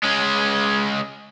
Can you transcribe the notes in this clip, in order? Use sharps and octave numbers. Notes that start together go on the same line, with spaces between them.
G#3 C#4